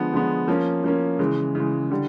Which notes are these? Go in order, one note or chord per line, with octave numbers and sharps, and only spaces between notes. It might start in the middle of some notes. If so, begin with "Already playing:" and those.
Already playing: D3 F3 G#3 B3
D3 F3 G#3 B3
F3 A#3 C#4
F3 A#3 C#4
C#3 E3 G#3
C#3 E3 G#3
D3 G3